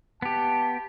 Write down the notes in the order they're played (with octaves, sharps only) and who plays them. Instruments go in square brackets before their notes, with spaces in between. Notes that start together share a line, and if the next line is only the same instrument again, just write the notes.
[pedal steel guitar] B3 G4 [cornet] A5